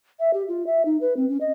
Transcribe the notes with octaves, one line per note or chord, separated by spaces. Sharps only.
E5
G4
F4
E5
D#4
B4
C4
C#4
D#5